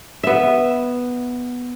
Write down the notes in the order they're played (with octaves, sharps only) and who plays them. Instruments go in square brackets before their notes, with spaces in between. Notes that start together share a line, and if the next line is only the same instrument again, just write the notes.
[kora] B3 E5